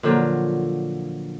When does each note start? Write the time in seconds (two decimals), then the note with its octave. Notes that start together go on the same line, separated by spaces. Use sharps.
0.03 A#2 D3 F3 F#3